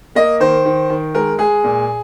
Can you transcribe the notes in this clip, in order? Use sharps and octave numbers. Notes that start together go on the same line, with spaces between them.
A#3 D#5
D#3 C5
D#3
D#3
G#3 A#4
G#3 G#4
A#2